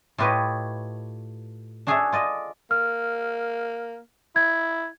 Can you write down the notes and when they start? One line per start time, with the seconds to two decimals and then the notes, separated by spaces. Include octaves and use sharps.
0.18 A2 F4 G4 B4 C#5 D#5
1.87 D4 F#4 G#4 A4 C#5 E5
2.12 F4 D5 D#5
2.71 A#3 F6
4.36 E4 G#6